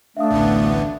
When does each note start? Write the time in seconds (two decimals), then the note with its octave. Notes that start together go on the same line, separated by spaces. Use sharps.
0.17 A3 D4 E5 F5 D#6
0.31 A1 D2 B3